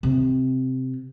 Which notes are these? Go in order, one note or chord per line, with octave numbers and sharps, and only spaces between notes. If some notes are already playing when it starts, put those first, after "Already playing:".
C3